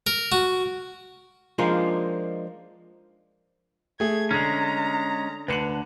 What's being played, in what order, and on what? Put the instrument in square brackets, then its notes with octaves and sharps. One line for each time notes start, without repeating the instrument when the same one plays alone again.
[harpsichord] A#4
F#4
[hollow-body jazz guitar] F3 G#3 A#3 D4 D#4 F4
[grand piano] A3 G#4 [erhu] G#6
[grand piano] D3 [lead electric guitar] G#3 C#4 [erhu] A#5
[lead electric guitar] D2 D3 [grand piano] B4 C#7 F#7